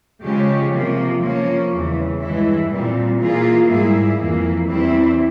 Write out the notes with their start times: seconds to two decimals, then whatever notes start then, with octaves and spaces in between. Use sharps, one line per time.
0.22 C#3 F3 G#3 C#4 G4
0.72 C3 F3 A#3
1.21 F3 A#3 C#4
1.71 E2 C#3 E3 G3
2.20 G2 E3 G#3 E4
2.70 A#2 G3 C4
3.20 E3 A#3 F4 G#4
3.69 G#2 G3 A#3 E4 G#4
4.19 F2 E3 A#3
4.68 E2 E3 G3 C4 E4